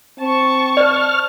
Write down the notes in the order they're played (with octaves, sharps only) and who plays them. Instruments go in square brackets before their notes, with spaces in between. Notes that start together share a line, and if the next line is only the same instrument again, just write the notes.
[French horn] C4 [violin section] A5 C#6
[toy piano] C5 D5 [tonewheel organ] F6